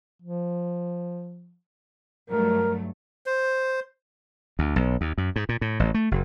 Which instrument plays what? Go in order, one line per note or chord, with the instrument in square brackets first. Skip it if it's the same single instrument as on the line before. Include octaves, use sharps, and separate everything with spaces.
[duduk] F3
[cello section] G2 F#3 A3 [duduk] A#4
[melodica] C5
[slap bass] D2
B1
D#2
F#2
G#2
A#2
A2
A1
A3
F#1